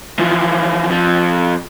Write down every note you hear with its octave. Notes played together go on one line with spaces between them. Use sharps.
E3 F3
F2 F3